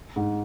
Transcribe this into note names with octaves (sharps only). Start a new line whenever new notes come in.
G#2